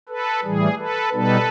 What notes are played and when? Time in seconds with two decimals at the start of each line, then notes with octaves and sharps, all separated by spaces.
0.08 A4 B4
0.43 A2 E3 G3 G#4
0.78 A4 B4
1.13 B2 G3 B3 D#4 A4 B4